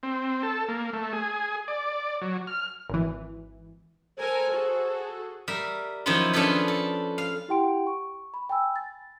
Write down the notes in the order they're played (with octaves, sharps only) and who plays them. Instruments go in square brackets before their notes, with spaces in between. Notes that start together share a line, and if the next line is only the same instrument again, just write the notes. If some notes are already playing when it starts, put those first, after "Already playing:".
[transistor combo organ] C4
A4
A#3
A3
G#4
D5
F#3
F6
[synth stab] G#1 E3
[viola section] A4 A#4 G#5 [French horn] C5
[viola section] F#4 G#4 A4
[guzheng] G3 A#4 E5
D#3 F3 F#3 C#4 E4 F4
C#4 D4 F4 G#4 A4 B4
A4
F5
[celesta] E4 G4 F#5 G5 C6 D7
C#6
B5
G5 G#5 B5 E6
A6